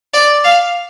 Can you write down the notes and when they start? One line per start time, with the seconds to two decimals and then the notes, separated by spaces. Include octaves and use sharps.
0.14 D5
0.44 F5